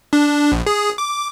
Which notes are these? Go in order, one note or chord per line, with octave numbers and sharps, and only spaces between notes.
D4
A#1
G#4
D6